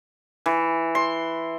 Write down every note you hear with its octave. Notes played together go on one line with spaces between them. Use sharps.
E3
C6